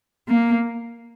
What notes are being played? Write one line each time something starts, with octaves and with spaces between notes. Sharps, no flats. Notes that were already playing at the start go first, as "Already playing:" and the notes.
A#3